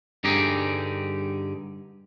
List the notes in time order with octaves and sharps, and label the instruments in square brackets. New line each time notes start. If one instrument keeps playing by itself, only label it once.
[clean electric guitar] G2 D3 D#4 G4 G#4